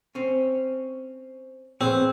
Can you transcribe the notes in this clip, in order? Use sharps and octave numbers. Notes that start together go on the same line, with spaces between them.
C4 C#4
C4 G#4 B4 C#5